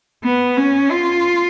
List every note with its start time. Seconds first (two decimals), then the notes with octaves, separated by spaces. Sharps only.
0.24 B3
0.57 C#4
0.90 F4